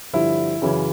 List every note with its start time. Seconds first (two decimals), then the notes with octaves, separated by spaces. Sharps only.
0.14 G2 D3 F3 E4
0.62 F#2 C#3 E3